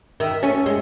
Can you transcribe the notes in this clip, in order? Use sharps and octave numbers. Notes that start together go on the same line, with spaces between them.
D#3 E5
A3 C#4
G#3